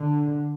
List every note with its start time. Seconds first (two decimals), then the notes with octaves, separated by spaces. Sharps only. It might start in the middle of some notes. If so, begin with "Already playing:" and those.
Already playing: D3